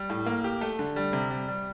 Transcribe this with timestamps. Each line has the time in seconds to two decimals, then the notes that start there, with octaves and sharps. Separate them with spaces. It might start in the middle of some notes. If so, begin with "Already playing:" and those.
Already playing: G3
0.10 A2
0.27 A#3
0.44 G4
0.61 A3
0.79 D3
0.96 G3
1.13 C3
1.30 G3
1.48 G3